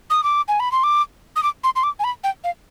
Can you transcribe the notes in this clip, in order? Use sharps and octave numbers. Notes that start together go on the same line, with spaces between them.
D#6
D6
G#5
B5
C6
D6
D#6
D6
C6
C6
D6
G#5
B5
G5
F5